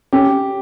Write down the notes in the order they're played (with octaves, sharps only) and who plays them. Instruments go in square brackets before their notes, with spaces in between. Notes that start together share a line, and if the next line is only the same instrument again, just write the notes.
[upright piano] C#4 [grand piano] G4